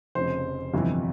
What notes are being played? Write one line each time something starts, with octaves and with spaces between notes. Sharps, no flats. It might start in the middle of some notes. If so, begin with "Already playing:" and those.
F1 F2 C#3 C5
G1 F2 C3 E3